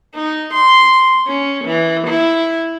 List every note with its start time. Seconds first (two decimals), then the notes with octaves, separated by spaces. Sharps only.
0.14 D#4
0.54 C6
1.27 C#4
1.65 E3
2.07 E4